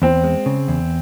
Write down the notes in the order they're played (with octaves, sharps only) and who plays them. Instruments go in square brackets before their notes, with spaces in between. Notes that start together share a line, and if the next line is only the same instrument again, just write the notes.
[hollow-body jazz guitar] E2 [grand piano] C4
[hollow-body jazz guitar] G#3
C#3
E2